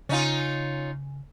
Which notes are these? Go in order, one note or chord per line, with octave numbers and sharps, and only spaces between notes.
C#3 C#4 D#4 F4